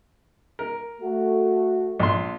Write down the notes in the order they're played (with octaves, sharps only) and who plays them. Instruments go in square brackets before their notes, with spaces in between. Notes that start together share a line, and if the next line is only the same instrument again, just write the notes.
[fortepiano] A#4
[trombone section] A3 F#4
[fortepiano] A#1 C6